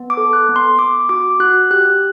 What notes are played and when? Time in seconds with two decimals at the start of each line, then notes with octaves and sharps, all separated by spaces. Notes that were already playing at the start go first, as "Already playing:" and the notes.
Already playing: B3
0.10 D6
0.17 A4
0.33 F#6
0.49 B3
0.56 C6
0.79 B3 D6
1.09 F#4 D6
1.40 F#4 F#6
1.71 G4 F#6